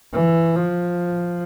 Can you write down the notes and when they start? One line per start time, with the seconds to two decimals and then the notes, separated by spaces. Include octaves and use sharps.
0.14 E3
0.56 F3